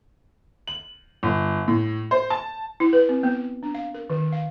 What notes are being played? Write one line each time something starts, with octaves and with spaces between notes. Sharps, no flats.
F#7
G1
A2
C5
A5
E4
B4
C4
B3
D4
F5
A#4
D#3
F5